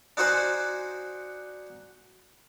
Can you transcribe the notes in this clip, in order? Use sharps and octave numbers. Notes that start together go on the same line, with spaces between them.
D4 D#4 F#4 C5 F#5 G#5